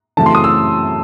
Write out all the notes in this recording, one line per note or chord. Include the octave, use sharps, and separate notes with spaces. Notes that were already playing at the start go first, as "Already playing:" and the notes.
F#2 C#3 E3 A3 C4 A5
C6
D#6
E6